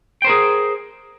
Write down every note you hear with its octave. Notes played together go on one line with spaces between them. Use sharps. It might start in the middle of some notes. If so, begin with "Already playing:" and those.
G#4 A#4 C5 G5